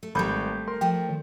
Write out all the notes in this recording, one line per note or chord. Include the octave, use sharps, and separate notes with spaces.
A3
G#1 G3 A3 B5 G6
A#4 C6
F3 A3 G5
D#3